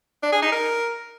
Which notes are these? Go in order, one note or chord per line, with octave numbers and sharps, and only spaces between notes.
D4
G#4
D#4
A#4